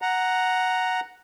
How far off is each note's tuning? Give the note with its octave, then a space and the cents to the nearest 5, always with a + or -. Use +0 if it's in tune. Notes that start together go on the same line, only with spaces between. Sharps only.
F#5 +0 A#5 +0